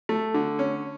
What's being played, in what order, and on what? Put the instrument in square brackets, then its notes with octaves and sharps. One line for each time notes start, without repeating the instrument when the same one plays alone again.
[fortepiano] A3
D3
C#4